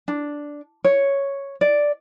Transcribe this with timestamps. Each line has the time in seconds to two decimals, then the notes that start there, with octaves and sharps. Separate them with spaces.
0.08 D4
0.84 C#5
1.61 D5